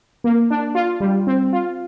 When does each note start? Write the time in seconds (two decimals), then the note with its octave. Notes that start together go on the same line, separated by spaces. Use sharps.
0.24 A#3
0.50 D4
0.75 F4
1.00 G3
1.27 C4
1.53 F4